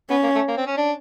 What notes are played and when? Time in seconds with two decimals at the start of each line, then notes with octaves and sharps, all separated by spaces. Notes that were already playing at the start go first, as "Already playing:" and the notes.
0.10 B3 C#4
0.23 A#3
0.35 A3
0.48 A#3
0.57 C4
0.67 C#4
0.77 D4